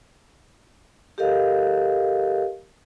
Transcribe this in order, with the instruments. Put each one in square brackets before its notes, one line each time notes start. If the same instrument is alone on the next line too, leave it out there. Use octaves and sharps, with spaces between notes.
[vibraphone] G4 A4 A#4 D#5 F5